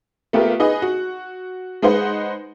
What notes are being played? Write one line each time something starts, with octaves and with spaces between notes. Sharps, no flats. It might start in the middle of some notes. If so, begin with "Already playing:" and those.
A3 B3 F4 G4 A#4
D#4 G#4 B4 D#5
F#4
G#3 D#4 B4 C5 F#5